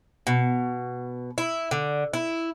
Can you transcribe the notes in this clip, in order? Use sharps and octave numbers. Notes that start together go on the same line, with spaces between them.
B2
E4
D3
E4